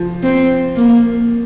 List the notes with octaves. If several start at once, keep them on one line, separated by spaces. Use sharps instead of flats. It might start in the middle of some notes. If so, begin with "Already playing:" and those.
Already playing: F3
C4
A#3